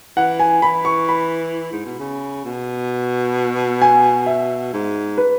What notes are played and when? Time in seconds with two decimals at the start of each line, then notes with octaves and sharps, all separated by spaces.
0.17 E3 F#5
0.40 G#5
0.62 E3 B5
0.85 C#6
1.09 B5
1.72 G#2
1.86 B2
1.99 C#3
2.45 B2
3.82 G#5
4.26 E5
4.73 G#2
5.18 B4